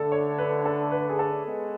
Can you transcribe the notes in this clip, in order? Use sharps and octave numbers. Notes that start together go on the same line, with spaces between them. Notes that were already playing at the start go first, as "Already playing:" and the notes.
Already playing: D3 A3 D4 A4
C#5
B4
A4
B4
G#4
A4
G#3 B3